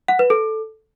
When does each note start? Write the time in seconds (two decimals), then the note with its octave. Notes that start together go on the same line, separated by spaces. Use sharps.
0.08 F#5
0.19 B4
0.30 A4